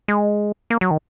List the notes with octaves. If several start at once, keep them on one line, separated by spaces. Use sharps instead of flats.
G#3
A#3
F#3
D#3